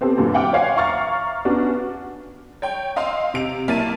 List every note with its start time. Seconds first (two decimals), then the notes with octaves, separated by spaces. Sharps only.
0.01 B3 C4 G4 A4
0.18 F#2 A#2 D3
0.34 E5 F#5 G5 D6 F6
0.53 C5 C#5 F5 F#5 G#5
0.76 E5 F5 A#5 C#6 F6 A6
1.45 B3 C#4 D4 F#4
2.62 C#5 G5
2.96 D#5 F5 C6 E6
3.34 C3 D7 F7
3.68 B1 A#3 E4 A5 A6 D#7